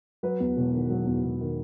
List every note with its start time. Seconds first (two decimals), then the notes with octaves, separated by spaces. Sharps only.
0.23 F#3 B4
0.40 E2
0.57 E1
0.73 D#3
0.90 F#3
1.07 E2
1.23 E1
1.40 D#3